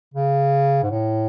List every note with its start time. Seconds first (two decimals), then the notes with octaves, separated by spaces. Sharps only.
0.14 C#3
0.83 G#2
0.90 A2